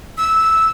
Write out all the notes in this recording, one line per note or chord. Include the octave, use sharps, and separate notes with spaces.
E6